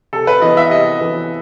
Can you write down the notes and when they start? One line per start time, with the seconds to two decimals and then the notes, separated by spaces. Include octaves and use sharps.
0.13 C3 A4
0.27 B4
0.42 E3 B3 D#5
0.57 E5
0.71 C3 D#5
1.01 E3 B3